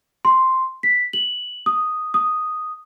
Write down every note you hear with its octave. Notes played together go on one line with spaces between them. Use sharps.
C6
B6
F#7
D#6
D#6